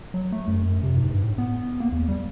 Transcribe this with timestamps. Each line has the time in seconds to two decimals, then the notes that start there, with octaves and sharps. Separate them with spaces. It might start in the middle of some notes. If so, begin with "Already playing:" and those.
0.14 F#3
0.32 A3
0.48 F#2
0.62 F#2
0.83 C3
0.97 G#2
1.10 G2
1.22 A2
1.38 B3
1.80 A#3
1.92 E2
2.08 G3